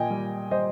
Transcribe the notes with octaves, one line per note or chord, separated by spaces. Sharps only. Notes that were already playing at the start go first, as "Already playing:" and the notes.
Already playing: A#2 D#5 G5 G#5
G3
G3 C5 D#5